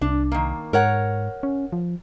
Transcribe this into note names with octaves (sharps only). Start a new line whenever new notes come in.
C2 D4
D#3 A#3
G#2 A#4 C#5 F#5
C#4
F3